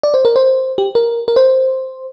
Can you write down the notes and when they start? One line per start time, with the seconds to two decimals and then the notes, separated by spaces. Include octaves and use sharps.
0.03 D5
0.14 C5
0.25 A#4
0.36 C5
0.78 G4
0.95 A#4
1.28 A#4
1.36 C5